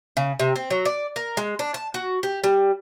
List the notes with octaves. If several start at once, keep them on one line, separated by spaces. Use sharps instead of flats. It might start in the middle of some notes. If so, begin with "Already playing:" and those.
C#3
C3
C4
F#3
D5
A#4
G#3
D4
A5
F#4
G4
G3